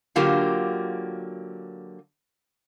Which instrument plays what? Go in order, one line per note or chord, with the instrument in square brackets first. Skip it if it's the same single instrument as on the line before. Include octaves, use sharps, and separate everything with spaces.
[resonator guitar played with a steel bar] D3 F#3 A#3 F4 G4